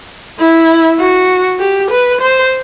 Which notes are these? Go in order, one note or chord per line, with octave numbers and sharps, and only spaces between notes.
E4
F#4
G4
B4
C5